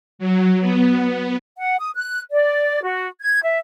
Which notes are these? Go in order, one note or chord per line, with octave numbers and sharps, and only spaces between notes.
F#3
B3
F#5
D#6
F#6
D5
F#4
G#6
E5